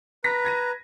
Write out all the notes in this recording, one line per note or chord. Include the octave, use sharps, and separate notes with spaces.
B4 A#5 A#6 B6
G#6 A#6 D#7